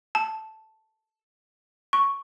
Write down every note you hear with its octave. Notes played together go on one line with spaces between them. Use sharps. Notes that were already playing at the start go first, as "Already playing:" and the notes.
A5
C#6